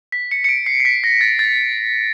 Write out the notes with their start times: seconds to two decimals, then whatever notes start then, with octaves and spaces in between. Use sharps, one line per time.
0.12 B6
0.31 C#7
0.44 C#7
0.49 D7
0.66 C7
0.80 C7
0.85 B6
1.04 A#6
1.21 A6
1.39 A6